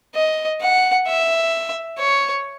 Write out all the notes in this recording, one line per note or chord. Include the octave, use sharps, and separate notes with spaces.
D#5
F#5
E5
C#5